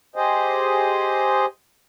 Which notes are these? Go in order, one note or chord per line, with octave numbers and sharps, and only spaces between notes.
G4 G#4 C5 D#5